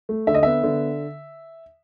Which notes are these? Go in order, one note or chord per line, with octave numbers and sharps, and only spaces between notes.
A3
D3 E5
D#5
B3 E5
D3